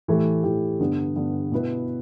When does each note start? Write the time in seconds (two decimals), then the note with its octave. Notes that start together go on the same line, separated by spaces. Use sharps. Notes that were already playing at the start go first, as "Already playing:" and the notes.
0.08 A2 E3 A3 G4
0.44 A2 E3 A3 G4
0.80 G2 D3 B3
1.16 G2 D3 B3
1.52 B2 B3 E4 B4